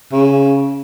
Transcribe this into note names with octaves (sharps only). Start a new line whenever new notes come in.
C#3